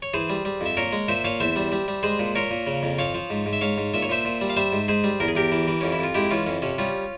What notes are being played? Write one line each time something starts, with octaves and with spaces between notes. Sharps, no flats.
C#5
E3 G#4 C5
G3
G3
F2 E5
A#2 A#4 C#5
G#3
A#2 C5 E5
A#2 C#5 F5
E2 C5 E5
G3
G3
G3
G#3 G#4 C5
A#2
A#2 A#4 C#5
A#2
C#3
F2
F3 C#5 F5
F3
G#2
G#2
E5
G#2 C#5 F5
G#2
A#2 E5
C#5
A#2 C5 E5
A#2
G3
F5
G3 C5 E5
G#2
G#2 G#4 C5
G3
E2 A#4
G#4
E2 G4 A#4
E3
E3
F2 C#4
E4
F2 F4
G#3 E4 G4
E3 C#4 F4
F2 C#4
C3 C#4
G3 C#4 F4